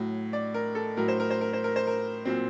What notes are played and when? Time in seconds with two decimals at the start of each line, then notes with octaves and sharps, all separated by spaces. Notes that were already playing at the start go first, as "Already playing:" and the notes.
Already playing: A2 F#3
0.33 D5
0.54 A#4
0.75 A4
0.97 A2 F#3 A#4
1.08 C5
1.20 A#4
1.30 C5
1.41 A#4
1.53 C5
1.64 A#4
1.76 C5
1.87 A#4
2.25 A#2 F#3 C4